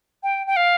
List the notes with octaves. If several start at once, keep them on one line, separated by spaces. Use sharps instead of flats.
G5
G5
F5